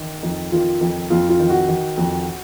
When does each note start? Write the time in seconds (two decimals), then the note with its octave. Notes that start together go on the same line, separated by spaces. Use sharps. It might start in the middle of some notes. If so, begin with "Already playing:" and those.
Already playing: D#3
0.23 F2 D#4
0.52 D#3 F4
0.81 F2 D#4
1.10 F2 F4
1.29 F4
1.40 D#3
1.50 F#4
1.68 D#3
1.97 F2